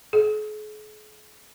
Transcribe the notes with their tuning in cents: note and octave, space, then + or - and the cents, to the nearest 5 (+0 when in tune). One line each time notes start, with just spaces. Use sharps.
G#4 +45